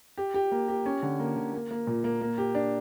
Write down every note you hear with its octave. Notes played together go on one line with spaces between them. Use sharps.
G4
G4
A#3
G4
C#4
D3
A#3
D3
A#3
A#3
A#2
A#3
A#3
G4
D4